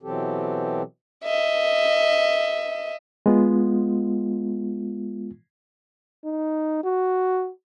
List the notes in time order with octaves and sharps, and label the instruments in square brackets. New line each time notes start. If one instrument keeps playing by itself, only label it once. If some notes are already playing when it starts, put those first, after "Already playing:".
[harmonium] B2 E3 F#3 C4 G4 A4
[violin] D#5 E5
[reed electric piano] G#3 B3 F4
[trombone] D#4
F#4